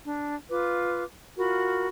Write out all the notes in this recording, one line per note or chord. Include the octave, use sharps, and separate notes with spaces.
D4
F4 B4 D6
F4 F#4 A#4 B5